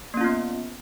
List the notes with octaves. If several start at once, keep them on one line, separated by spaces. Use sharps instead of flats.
A#3 B3 C#4 F4